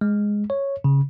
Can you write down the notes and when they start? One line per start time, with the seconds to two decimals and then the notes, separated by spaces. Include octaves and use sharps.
0.01 G#3
0.50 C#5
0.84 C#3